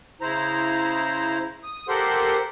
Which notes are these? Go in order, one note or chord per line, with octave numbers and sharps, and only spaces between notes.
C#3 E4 C5 A#5
D#6
G4 A4 A#4 C5 F#5 C6